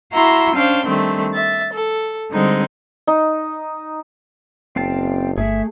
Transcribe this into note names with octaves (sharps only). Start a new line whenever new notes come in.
E4 F#4 F5 A#5 C6 E6
C#4 D4 C5 F5 G5
D#3 G3 A3 C4 D4
E5 A6
A4
D3 G3 G#3 C4 D#4
D#4
F#1 C4 F5 G5 A5
G1 A3 G#4 E5